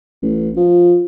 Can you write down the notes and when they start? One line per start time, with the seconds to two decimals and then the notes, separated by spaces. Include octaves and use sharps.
0.23 A1
0.57 F3